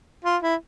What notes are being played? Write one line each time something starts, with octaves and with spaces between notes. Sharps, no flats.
F4
E4